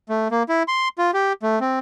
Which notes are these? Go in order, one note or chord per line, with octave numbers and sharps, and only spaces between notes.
A3
A#3
E4
C6
F4
G4
A3
C4